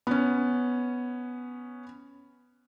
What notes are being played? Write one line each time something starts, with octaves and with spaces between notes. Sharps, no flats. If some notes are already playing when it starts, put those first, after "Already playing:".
B3 C#4